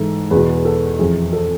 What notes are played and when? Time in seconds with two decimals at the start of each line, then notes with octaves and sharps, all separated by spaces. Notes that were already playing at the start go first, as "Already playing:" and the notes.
Already playing: G#2 E3 A4
0.31 E2 B2 G#4 B4
0.65 A4
0.99 F2 E3 G#4
1.33 A4